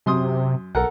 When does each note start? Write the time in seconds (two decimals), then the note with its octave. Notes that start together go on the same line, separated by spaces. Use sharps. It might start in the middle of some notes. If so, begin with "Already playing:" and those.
0.06 F#2 C3 C6 D#6
0.75 B1 A4 A#4 F#5